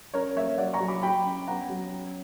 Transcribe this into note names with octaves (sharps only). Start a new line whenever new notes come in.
C#4 A#4 C#5
A#3 C#5 E5
F#3 D5 F#5
A#5 C#6
F#3
B5 D6
F#3 G5 B5
C#4
B3 F#5 A#5
F#3
C#4